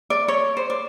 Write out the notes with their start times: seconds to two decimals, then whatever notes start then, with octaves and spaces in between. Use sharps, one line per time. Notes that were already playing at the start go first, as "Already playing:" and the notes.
0.10 D5
0.28 C#5
0.57 C5
0.70 D5